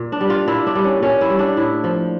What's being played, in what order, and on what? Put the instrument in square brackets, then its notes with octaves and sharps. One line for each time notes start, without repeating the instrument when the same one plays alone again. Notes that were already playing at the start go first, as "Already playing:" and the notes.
Already playing: [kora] A#2
D4
G3
F4
A#2 E4
D4
G3
C#4
A#2 C#4
E4
G3
D4
A2 E4
F3